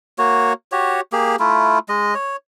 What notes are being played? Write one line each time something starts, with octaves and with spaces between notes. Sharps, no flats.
A#3 F#4 C#5
F#4 G4 C#5
A#3 G4 G#4
A3 E4 F4
G#3 D#5
C#5